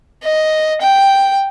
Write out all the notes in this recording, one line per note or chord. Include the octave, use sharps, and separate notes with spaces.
D#5
G5